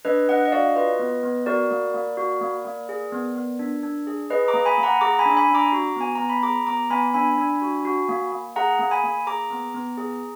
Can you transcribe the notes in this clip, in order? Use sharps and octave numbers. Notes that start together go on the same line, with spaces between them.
D4 B4 D#5
D4 D#5 F#5
D#5
F#4 D5 F5
F4 B4 D#5
B3
B3
F#4 A#4 D5
A#3
A#3
F#4
A#3
A#3
G#4
B3
B3
D4
D4
G#4
G#4 B4 D#5
A#5 D6
A#3
G#5 B5
A#3
F#5 A#5
G#4 A#5 D6
G#5 B5
D4
G#5 B5
D4
A#5 D6
F#4
B3 G#5
B3 A#5
B5
G#4 A#5 D6
B3 A#5 D6
B3 G#5 B5
D4 G#5 B5
D4
F#4
F#4
A#3
A#3
G#4 F#5 A#5
A#3
G#5 B5
A#3
G#4 A#5 D6
B3
B3
G#4